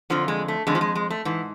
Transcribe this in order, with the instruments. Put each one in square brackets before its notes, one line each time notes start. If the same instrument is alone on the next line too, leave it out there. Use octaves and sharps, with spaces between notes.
[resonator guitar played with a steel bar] F2 D3 F3
G#3
A3
F2 D3 G#3
F3
G#3
G#3
A3
G#2 E3